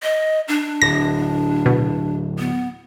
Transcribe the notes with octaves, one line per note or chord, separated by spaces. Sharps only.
D#5
D4
D1 A#6
B2
B3